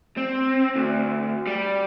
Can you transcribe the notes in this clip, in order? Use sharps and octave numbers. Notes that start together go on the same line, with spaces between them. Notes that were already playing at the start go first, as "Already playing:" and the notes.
C4
D2
G3